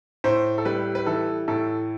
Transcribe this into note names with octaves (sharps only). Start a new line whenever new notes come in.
A2 C5
A4
G3 B4
B4
E3 A4
A2 A4